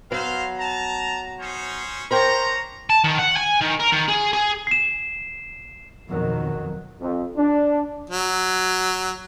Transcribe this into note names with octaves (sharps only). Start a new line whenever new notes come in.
F#3 B3 C5 F5
A5 A#5
C#4 D#4 C5
D4 A#4 C5 C#5 G5 A#5
A5
D#3
F#5
G#5
D#3
A#4
D#3
G#4
G#4
C7 E7
F2 B2 D#3 F#3
F2
D4
F#3